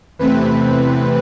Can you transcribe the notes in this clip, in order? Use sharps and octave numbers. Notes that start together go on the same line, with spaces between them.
E2 C3 E3 A3 C4 B4